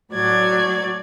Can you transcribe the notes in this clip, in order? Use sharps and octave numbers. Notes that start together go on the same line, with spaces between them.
A2 F#3 D5 G#6